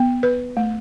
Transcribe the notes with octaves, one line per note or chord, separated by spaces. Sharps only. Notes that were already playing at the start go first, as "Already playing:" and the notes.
Already playing: B3
B4
A3